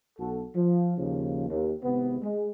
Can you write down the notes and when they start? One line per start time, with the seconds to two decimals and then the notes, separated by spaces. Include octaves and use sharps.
0.18 B1 F#4 A4
0.55 F3
0.98 D#2 C#3 F3
1.50 D#2
1.84 G#1 C3 B3
2.21 G#3